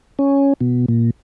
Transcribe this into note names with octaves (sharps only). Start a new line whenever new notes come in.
C#4
B2
A#2